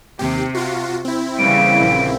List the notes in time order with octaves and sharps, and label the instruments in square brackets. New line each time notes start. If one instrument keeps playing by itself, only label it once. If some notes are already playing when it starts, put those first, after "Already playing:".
[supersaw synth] D#2 G4 [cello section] C3
[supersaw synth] F4 F#4
C4 E4
[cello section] C#3 E3 G3 [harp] A#3 C#4 [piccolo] D7
[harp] A#1